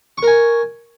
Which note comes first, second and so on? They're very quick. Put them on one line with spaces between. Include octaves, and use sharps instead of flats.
C#6 A#4 G#5